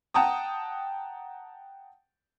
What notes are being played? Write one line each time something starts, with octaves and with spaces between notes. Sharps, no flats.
F#5 G5 A5 A#5 D#6